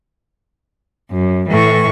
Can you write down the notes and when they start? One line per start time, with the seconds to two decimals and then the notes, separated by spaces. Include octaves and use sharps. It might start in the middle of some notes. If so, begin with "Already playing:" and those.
1.11 F#2
1.50 A2 E3 C#6